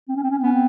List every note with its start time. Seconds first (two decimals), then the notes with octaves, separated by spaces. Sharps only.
0.09 C4
0.16 C#4
0.23 C4
0.30 C#4
0.38 C4
0.44 B3 C#4
0.52 C4